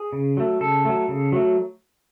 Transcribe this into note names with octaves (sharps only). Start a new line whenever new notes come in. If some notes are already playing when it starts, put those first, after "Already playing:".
Already playing: G#4
C#3
F#3 A3
C#3 A4
F#3 A3
C#3
F#3 A3